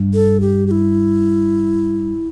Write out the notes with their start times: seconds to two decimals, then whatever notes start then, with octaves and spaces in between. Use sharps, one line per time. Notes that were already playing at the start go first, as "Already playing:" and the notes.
Already playing: G2
0.14 A4
0.41 G4
0.67 G4
0.71 E4